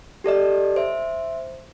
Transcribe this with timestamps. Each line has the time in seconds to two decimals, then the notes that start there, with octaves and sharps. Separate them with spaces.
0.24 G4 A4 D5 D#5
0.76 C5 E5